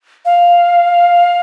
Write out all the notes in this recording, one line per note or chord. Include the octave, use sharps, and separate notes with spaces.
F5